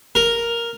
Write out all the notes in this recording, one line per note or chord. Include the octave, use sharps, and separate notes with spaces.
A#4